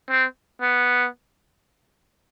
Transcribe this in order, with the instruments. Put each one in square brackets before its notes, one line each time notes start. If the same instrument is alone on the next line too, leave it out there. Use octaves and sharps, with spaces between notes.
[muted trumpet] C4
B3